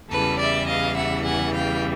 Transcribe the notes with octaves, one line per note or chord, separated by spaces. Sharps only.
E2 C#3 E3 G3 A4 B4
D5 E5
D#5 F5
E5 F#5
F#5 G#5
F5 G5